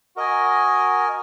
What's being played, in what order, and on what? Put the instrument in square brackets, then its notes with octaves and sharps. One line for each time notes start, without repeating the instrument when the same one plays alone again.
[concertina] F#4 A#4 D#5 G#5